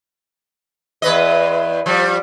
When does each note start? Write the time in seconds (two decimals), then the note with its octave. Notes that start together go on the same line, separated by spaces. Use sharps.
1.02 E2 B4 D#5
1.86 F3 G3